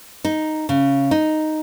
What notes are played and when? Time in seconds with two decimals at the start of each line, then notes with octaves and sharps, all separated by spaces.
0.25 D#4
0.69 C#3
1.11 D#4